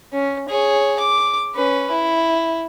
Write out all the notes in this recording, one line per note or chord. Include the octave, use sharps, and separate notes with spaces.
C#4
G#4 C#5
D6
C#4 B4
E4